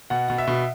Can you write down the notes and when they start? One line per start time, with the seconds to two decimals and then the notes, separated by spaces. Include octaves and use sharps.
0.10 B2 F#5
0.28 B2 F#5
0.38 E5
0.47 B2